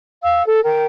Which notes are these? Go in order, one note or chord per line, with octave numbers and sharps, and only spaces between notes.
F5 E6
A4
A#4 G5